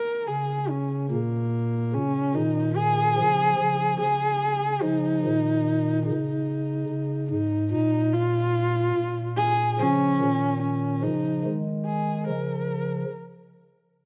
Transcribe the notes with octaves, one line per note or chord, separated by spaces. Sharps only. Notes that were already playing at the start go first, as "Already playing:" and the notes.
Already playing: A#4
C#3 G#4
C#4
A#2 A#3
C#3 C#4
A#2 D#3 D#4
G#4
C#3 F3
C#3 F3
C#3 G#4
C#3 F3 D#4
A#2 D#3
C#3 D#4
C#3
G#2 D#4
A#2 D#4
F4
A#2
G#4
C#3 F3 C#4
A#2 D#3
C#4
C#3 F3 D#4
D#3 G#3
G#4
C#3 F3 A#4